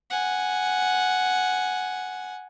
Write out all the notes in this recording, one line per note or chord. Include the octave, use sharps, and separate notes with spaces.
F#5 G#5